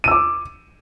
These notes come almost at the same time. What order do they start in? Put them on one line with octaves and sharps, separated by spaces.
D#7 E6 D6